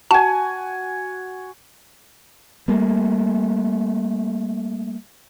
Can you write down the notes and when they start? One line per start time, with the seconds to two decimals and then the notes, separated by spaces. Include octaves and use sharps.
0.11 F#4 G#5 A5
2.68 G3 A3 A#3